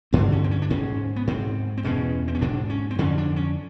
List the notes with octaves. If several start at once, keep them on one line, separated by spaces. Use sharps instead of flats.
G2 D3 C4
C#4
C4
C#4
D4
G#2 C#4
B3
G#2 C4
C4
E2 B2 C#4
C4
C#4
G#2 D4
C#4
C4
F2 D3 C#4
D4
C#4